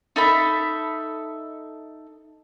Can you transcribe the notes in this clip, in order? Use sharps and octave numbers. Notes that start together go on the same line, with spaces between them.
D#4 A4 E5 B5